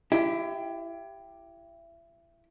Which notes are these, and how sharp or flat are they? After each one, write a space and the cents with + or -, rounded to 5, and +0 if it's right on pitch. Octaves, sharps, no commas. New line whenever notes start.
E4 +30 G4 +0 E5 -35